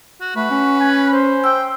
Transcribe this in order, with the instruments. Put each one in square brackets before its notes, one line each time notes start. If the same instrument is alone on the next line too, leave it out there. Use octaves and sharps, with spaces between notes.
[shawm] F#4
[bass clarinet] A3 [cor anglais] F#4 [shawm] B4
[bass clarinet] C#4
[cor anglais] G#5
C5
[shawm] G5 [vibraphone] E6